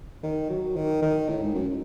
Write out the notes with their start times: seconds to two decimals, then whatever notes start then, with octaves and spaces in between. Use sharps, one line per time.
0.23 D#3
0.50 F#3
0.76 D#3
1.02 D#3
1.29 A2
1.42 G#2
1.54 F#2